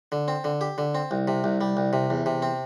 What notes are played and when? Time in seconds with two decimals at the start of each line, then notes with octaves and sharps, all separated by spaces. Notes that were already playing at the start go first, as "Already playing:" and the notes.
0.12 D3
0.28 C4
0.44 D3
0.61 G4
0.78 D3
0.95 C4
1.11 C2
1.28 C3
1.44 C2
1.61 G3
1.77 C2
1.93 C3
2.10 E2
2.26 C3
2.42 C4